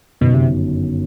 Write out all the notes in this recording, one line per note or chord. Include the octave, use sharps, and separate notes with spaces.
G1 F#2 B2 D#3
C3